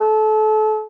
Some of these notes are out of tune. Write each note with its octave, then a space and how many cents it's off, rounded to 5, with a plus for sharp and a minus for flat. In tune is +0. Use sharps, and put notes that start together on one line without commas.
A4 -30